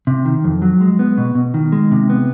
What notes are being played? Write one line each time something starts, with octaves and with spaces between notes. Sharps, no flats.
C3
D#3
F2
F#3
G#3
B3
B2
B2
D#3
G#3
C3
B3